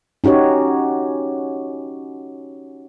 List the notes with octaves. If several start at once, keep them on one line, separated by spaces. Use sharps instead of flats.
C#4 D#4 F#4 G4 C#5